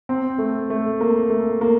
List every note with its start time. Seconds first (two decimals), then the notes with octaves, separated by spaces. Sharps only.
0.09 C4
0.38 A3
0.70 A3
1.01 A#3
1.30 A3
1.61 A#3